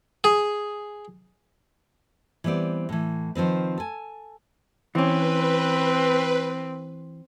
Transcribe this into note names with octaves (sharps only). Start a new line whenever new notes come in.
G#4
E3 G3 B3 C4 D5
A2 E3
D#3 F3 C4 B4
A4 G#5
E3 C4 C#4 B4